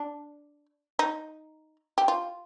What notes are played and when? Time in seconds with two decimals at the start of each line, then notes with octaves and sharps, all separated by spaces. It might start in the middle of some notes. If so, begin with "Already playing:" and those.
Already playing: D4
0.99 D#4
1.98 G4
2.08 F4